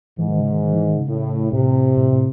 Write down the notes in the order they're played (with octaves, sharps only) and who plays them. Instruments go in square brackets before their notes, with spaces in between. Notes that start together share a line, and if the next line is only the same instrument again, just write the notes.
[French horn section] G#2 [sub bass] E3
[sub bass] D#3
C#3
D#3
D#3
E3
D#3
C#3
[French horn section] A2
[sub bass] A2 [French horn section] C3
[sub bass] A2
A2